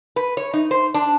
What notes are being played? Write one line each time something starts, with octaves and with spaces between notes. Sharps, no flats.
B4
C#5
D#4
C5
D4